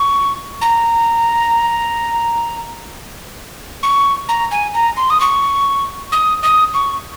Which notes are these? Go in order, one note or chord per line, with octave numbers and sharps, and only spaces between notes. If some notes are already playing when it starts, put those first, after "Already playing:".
Already playing: C#6
A#5
C#6
A#5
G#5
A#5
C6
D#6
C#6
D#6
D#6
C#6